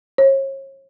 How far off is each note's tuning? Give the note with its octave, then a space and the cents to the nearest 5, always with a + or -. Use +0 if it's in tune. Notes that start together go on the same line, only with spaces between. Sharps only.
C#5 -40